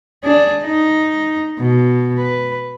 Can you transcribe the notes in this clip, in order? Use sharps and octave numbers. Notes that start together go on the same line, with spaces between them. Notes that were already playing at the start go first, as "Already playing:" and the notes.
D4 G#4
D#4
B2
B4